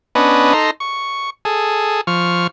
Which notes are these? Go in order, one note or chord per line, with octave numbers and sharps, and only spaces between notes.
B3 C#4 D4 B4 D#5
D#4 A4 A#5 C6
C#6
G#4 A4
F3 C#6 F6